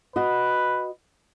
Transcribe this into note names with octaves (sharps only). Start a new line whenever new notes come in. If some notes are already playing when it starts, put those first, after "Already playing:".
F#4 B4 D#5